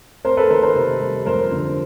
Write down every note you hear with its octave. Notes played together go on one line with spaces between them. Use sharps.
C4 A#4 C5
A4 B4
D#3 A#4 C5
A#4 C5
C3
G3
F2 A#4 C5
D3